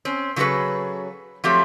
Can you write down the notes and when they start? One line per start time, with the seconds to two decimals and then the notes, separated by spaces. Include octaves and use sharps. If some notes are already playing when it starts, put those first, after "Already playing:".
0.05 C4 C#4
0.36 C#3 F#3 F4 G#4 A4 B4
1.44 F3 F#3 A3 C4 G4